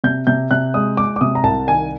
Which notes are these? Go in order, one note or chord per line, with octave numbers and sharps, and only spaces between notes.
C3 G6
C3 G6
C3 F#6
G#3 D#6
G#3 D6
D6
C3 D#6
A#5
C2 A5
D#3 G#5